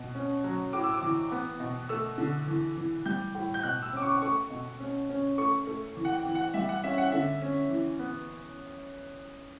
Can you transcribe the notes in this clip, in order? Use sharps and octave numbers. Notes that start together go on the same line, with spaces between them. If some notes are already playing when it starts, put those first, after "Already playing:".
Already playing: B2
C#4
F#3
A2 D6
E6
D6
E3
B3
B2
A3 E6
D3
E3
E3
G3 G6
A2
G6
B2 F#6
E6
C#4 D6
C#6
A3 C#6
B2
C#4
C#4
A3 C#6
A3
E3
F#5
G5
E3
F#5
G3 E5
F#5
C#4 E5
F#5
D3 E5
C#4
E3
B3